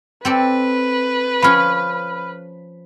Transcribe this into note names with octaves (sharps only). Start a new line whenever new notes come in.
C4 A4 B4 D5
F3 C#4 B5 F6